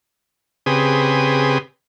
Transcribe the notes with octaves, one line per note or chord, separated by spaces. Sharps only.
C#3 C4 G4 G#4 B4 D#6